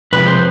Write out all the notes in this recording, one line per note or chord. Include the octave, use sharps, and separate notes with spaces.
F2 C3 F3 G#3 B4
C5